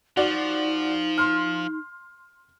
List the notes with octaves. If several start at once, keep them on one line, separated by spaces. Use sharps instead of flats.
F3 D#4 F#4 D5
C6 F6